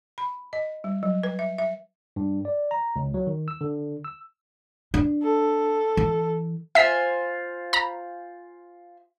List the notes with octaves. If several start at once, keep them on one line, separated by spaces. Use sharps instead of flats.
B5
D#5
G3
F#3
B4
E5
E5
G2
D5
A#5
C#2
F#3
D#3
E6
D3
E6
D4
A4
E3
F4 C5 E5 G#5 B6
A#5 B5